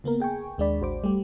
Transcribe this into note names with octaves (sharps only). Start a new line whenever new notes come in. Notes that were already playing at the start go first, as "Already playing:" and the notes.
C#3 A#3 B3 A#4
G#4 G5 G#5 C#6
D#2 G#3 D4 D5 B5
A1 F#4 C5 D6
G3 A3 G4